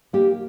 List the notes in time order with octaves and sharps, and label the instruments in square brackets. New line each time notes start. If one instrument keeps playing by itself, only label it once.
[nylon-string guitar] A#3 G4